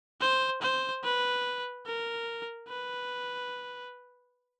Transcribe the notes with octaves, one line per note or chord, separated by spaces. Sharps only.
C5
C5
B4
A#4
B4